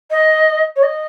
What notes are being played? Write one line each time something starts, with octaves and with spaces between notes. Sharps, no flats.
D#5
C#5
D#5